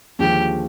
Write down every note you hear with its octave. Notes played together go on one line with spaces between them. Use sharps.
D#2 D3 F3 G#3 G4